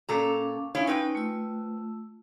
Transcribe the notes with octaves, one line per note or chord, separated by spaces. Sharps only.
A#2 C#4 A4 F5 A#5 D6
C#4 D#4 E4 C#5 F5 G#5
C4 B4 G5
A3 F4 E6